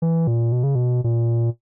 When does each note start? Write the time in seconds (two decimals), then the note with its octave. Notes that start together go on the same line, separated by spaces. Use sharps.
0.02 E3
0.27 A#2
0.52 B2
0.63 C#3
0.75 B2
1.04 A#2